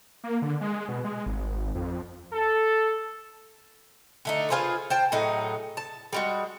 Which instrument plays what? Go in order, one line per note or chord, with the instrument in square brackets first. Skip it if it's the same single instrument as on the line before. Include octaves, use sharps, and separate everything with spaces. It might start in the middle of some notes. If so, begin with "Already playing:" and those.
[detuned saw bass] A#3
D3
G#3
B2
G#3
G#1
G#1
F2
[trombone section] A4
[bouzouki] D3 A3 D#4
F4 G#4 B4 C5
C5 G5 A5
A2 F#3 D#4 G#4
A5
G3 G#3 F#4